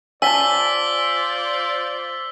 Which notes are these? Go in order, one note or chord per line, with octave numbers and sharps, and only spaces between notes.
F4 C5 D5 G#5 A5 E6 B6 G7